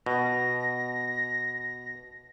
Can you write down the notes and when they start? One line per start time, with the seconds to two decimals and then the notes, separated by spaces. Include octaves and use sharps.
0.06 B2 A#6